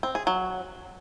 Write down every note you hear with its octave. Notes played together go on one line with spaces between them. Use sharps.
C4
G#4
F#3